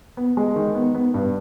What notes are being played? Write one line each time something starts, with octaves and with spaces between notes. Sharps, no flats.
B3
G#3
D#3
B3
B3
G2